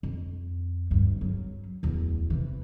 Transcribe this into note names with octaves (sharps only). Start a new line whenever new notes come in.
F2
D2 G2
F#3 C#4
D1 E2
C3 E3